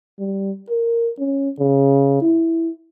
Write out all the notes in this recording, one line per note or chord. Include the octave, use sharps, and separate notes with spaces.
G3
A#4
C#4
C#3
E4